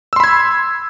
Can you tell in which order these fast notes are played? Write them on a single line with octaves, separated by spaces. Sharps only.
E6 C6 B5 G#6